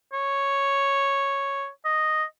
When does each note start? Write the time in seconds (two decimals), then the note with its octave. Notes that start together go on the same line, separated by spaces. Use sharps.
0.13 C#5
1.85 D#5